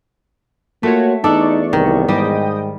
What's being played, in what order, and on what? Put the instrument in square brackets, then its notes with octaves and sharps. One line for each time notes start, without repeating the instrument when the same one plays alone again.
[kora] A3 [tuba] A#3 [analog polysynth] F4 F#4 C#5
[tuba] E2 [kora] D4 A4 [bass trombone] D#4 [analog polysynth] D5 C#6
[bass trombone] C2 [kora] D#3
[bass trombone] G#2 [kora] G3 [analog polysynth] D#5 G5 D#6